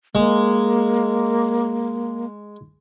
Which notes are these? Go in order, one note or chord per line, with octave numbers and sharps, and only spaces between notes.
G#3 A#3